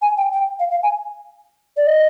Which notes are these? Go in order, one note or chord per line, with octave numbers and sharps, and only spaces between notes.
G#5
G5
G5
F5
F5
G#5
D5
D#5